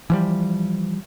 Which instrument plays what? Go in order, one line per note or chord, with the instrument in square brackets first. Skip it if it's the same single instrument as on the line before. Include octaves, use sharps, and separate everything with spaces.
[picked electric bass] E3 F3 G3